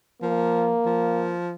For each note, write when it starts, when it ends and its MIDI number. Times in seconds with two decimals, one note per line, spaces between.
0.22 0.75 53
0.22 1.35 58
0.85 1.54 53